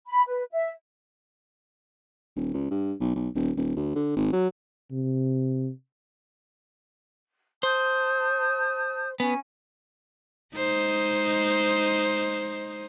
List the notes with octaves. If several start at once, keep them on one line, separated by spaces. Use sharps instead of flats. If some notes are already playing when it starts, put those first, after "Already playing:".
B5
B4
E5
D#1
C#2
G2
B1
B1
D#1
D#1
D2
D3
G#1
F#3
C3
C5 A5 D#6 G6
B3 C#4 G#5
G#3 D#4 C5